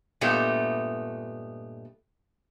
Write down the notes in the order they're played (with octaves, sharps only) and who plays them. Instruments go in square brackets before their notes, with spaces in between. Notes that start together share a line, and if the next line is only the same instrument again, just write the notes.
[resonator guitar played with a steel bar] G2 A#2 A3 B3 D#4 G4